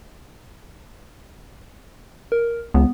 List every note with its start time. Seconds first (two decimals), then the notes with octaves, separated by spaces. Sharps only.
2.32 A#4
2.74 C#2 B3